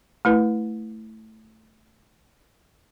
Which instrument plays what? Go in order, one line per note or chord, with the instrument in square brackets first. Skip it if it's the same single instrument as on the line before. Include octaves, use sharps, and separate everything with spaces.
[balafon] A3 E4 B4